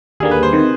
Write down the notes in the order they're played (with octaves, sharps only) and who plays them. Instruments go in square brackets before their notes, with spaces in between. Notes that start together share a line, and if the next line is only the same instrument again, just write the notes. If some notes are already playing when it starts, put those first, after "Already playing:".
[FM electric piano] D#2 D3 G3 A#3 [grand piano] G#4
[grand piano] B4
C5
[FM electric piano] C3 D#3